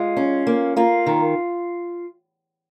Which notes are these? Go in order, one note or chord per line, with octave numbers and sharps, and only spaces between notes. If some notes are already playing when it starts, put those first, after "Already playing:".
Already playing: G#3 F4
C#4
A#3
A#3 F4
D#3